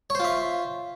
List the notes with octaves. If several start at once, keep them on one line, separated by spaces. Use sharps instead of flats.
F4 C5 C#5 E5